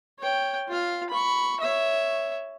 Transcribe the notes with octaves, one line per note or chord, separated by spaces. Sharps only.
C#5 G5
F4 F5
B5 C#6
C#5 E5